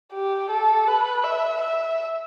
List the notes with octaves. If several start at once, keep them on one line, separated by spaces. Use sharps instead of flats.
G4
A4
B4
E5
E5